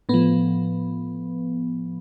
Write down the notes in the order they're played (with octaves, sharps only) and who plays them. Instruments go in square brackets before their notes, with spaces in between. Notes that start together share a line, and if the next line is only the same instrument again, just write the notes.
[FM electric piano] A2 F3 B3